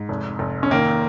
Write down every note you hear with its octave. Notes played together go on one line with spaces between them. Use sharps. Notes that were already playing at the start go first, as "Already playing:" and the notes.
Already playing: G#2
F1
F1
C#4
D#3 A#3